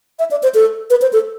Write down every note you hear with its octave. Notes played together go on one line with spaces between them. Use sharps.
E5
D5
C5
A4
B4
C5
A4